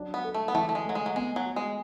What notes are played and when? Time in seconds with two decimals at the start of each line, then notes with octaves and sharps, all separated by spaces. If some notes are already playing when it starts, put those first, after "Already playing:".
Already playing: F#3 D4
0.14 B3
0.24 A4
0.34 A3
0.48 B3
0.54 E3 A3
0.69 A3
0.75 G#3
0.85 F#3 A3
0.95 G#3
1.06 F#3
1.16 G#3 B3
1.36 F#3
1.46 F#4
1.56 G#3